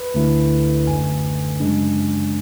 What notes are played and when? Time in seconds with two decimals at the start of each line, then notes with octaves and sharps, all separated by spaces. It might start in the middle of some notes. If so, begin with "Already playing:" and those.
Already playing: B4
0.14 D2 D3 A3 E4
0.87 G#1 F#2 D3 A3 G#5
1.60 F#2 C#3 G#3 D4